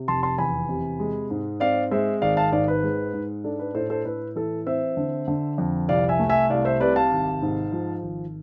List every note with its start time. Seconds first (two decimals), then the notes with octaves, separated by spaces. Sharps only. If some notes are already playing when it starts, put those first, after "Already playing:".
Already playing: C3
0.08 F1 A5 C6
0.23 A5 C6
0.38 E2 G#5 B5
0.69 C3
0.99 G#3
1.30 G#2
1.60 C4 D5 F5
1.91 G#3 C5 E5
2.22 G#1 D5 F5
2.37 F5 A5
2.52 G#2 D5 F5
2.68 B4
2.83 G#3
3.13 G#2
3.44 D4 A4
3.59 B4
3.75 A2 A4 C5
3.90 A4 C5
4.05 A2 B4
4.36 E3 A4
4.67 C4 C5 E5
4.97 D3
5.28 D3
5.58 F2
5.89 C2 D5 F5
6.09 E5 G#5
6.19 A3
6.29 E5 G#5
6.50 C2 D5 F5
6.65 C5 E5
6.80 C3 B4 D5
6.96 F5 A5
7.11 G#1
7.42 G#2
7.72 F3
8.03 G#1